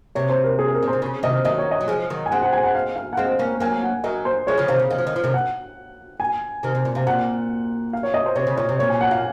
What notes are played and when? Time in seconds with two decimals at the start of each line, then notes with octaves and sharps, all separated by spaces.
0.15 C3 C#5
0.29 C5
0.44 A#4
0.59 G#4
0.73 A#4
0.83 A#2
0.87 C5
0.93 C3
1.02 C#3
1.23 C3 D#3 D#5
1.45 D#3 F#3 D#5
1.58 C#5
1.71 D#5
1.81 F#3
1.88 F3 G#3
2.10 D#3 F#3
2.26 G#5
2.31 G#3 C4 F#5
2.42 F#5
2.53 G#5
2.64 F#5
2.75 F5
2.96 F5
3.13 F#5
3.17 G#3 C4 F5
3.39 A#3 C#4
3.60 F#3 A#3 G#5
3.83 F#5
4.04 F#3 A#3 D#5
4.25 C5
4.47 F3 G#3 C#5
4.58 C#3 F3
4.68 C3 D#3 F5
4.79 C#3
4.90 D#3 F5
4.98 F3
5.07 D#3
5.16 F3
5.24 C3 D#3
5.34 F#5
6.20 G#5
6.63 C3 D#3
6.75 C3
6.85 A#2
6.95 C3 F5
7.07 A#2 F#5
7.93 F5
8.03 C#5
8.14 D#5
8.26 C5
8.36 C3 C#5
8.47 C#3
8.57 A#2 C#5
8.69 C3
8.79 A#2 C#5
8.90 G#5
9.01 F#5
9.11 A#2 F5